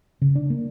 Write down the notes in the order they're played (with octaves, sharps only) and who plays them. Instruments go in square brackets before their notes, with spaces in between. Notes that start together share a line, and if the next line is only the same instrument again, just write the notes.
[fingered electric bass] C#3
D4
A#3